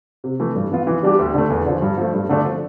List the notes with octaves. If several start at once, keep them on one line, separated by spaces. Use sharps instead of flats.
C3
E3 A3
G2
E3 B3 F4
E3
G3 D4 G4
D2
D3 A3
E2
D3 F3
G2
F3 A3
G2
D3 A3 D4 A4
F3